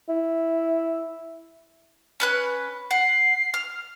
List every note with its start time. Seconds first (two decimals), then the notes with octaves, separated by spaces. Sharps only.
0.09 E4
2.20 C#4 B4 F#6
2.91 F#5 C7
3.54 F6